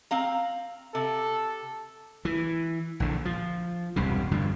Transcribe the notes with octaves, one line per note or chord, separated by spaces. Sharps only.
C4 F5 A#5
C3 A4
E3
A#1 D3
F3
E1 C2 G2 C3
G2 D3 F3